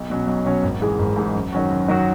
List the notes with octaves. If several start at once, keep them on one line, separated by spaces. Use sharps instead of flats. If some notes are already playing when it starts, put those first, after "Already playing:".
Already playing: B1
B2 F#3 C#4
B1
B2 F#3 C#4
G#1
G#2 E3 G#3
G#1
G#2 E3 G#3
F#2
D#3 F#3 C#4 F#4
F#2
D#3 F#3 C#4 F#4